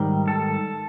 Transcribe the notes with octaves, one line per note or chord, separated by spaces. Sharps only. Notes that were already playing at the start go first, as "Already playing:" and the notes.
Already playing: G#2 D#3 G3
A4